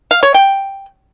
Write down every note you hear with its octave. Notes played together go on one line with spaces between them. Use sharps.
F5
C#5
G5